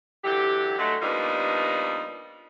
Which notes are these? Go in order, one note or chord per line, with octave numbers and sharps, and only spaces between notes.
D3 E3 F#3 G4
D3 F#3 G#3 A3
F3 G3 A#3 B3 D4 D#4